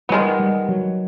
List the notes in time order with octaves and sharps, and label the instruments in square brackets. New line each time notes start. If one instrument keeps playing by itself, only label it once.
[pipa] D#3 G#3 B3 [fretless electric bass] G3
[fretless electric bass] G3
F#3